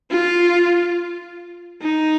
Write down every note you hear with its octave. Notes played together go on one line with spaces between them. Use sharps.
F4
D#4